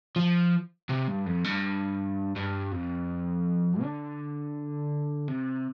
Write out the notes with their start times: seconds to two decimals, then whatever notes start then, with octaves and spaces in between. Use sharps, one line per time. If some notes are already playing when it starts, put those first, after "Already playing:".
0.16 F3
0.89 C3
1.07 G2
1.26 F2
1.44 G2
2.36 G2
2.72 F2
3.82 D3
5.28 C3